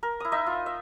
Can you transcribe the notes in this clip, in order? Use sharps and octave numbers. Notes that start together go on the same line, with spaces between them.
A#4
E4 D#6
D#4 E4 D#5 E5
F4
E5